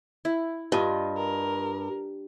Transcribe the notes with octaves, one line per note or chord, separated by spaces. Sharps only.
E4
G2 F4 D#5
A#4